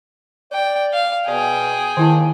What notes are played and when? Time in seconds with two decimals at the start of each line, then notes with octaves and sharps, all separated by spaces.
0.52 D5 G5
0.93 F5
1.28 B2 G#4 D5 G5
1.97 D#2 D#3 A#3 E4 A5